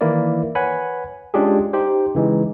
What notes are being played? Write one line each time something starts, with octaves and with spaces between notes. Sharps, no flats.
D#3 E3 A#3 E4 A#4 D5
B4 C#5 F#5 G#5 B5
G#3 C#4 D4 F4 G4 G#4
D#4 G4 C5
C#3 E3 G#3 D#4